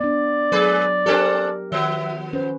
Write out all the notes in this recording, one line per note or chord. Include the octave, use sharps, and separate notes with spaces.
B3 D4 D5
F#3 G#3 G#4 B4
C4 D4 G4 A4 A#4
D#3 F3 B3 E5
C#4 B4 C5